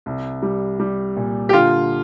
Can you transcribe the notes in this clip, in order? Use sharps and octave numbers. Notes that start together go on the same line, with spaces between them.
C2
G3
G3
A#2
G4
D3 F4